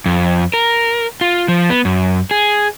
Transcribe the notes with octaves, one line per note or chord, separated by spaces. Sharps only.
F2
A#4
F4
F3
B3
F#2
G#4